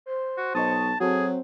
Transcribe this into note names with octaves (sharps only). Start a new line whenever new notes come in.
C5
F#4
B1 D#5 A5 C#6 D#6
F#3 C4 F#4 G#4 A4